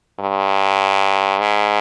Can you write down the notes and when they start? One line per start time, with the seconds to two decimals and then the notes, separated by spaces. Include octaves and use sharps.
0.20 G2
1.40 G#2